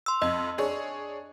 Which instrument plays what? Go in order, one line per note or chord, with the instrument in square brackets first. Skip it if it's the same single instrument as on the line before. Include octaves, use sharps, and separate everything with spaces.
[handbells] C6 E6
[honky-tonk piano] F2 [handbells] D#5
[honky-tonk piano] D4 G#4 C#5